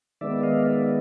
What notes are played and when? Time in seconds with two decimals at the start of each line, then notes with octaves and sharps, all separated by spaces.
0.21 D#3 G#3 B3 D5 E5
0.43 D#5 F5
0.65 D5 E5